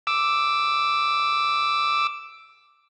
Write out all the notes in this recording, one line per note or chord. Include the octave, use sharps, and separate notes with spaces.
D6 E6